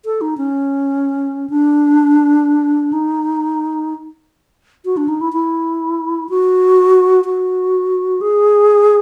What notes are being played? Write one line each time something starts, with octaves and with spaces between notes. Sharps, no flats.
A4
D#4
C#4
D4
D#4
F#4
D4
D#4
E4
E4
F#4
F#4
G#4